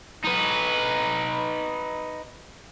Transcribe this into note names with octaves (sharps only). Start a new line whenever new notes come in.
D#4 B4